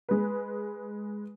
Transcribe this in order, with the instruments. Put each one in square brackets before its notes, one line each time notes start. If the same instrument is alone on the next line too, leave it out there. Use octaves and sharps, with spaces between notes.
[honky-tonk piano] G#3 B4